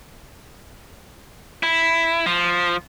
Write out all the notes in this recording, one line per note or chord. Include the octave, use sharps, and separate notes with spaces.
E4
F3